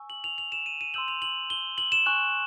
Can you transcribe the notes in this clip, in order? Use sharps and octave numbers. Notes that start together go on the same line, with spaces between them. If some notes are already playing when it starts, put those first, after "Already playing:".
Already playing: G#5 C#6 E6
F#7
F7
F7
E7
D#7
D#7
C6 E6 G6 F#7
F7
F#7
G7
F#7
E7
G#5 C#6 F#6